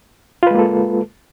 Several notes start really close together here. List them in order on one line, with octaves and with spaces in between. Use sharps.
F4 B4 G#3 A#3 A4